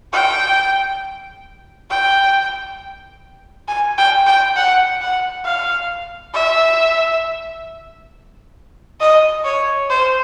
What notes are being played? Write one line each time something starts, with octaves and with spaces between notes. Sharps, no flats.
G5
G5
G#5
G5
G5
F#5
F#5
F5
E5
D#5
C#5
C5